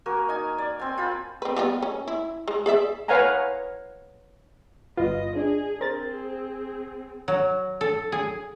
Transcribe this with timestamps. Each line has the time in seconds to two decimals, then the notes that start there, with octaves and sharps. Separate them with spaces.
0.06 A#3 F#4 A#4 G#5
0.29 D#4 G#5
0.58 D5
0.79 C4 G#5
0.98 F4 C5 G#5 B5
1.42 C4 B4
1.56 G3 B3 F4
1.83 C#4
2.07 E4
2.48 G#3
2.66 G#4 D5 E5
3.08 B4 C#5 F5 F#5 G#5 A#5
4.97 G1 F4 B4 D#5
5.36 D4 G#4
5.81 C4 G#4 A#4 C5 A6
7.28 F#3
7.81 A4
8.12 G#4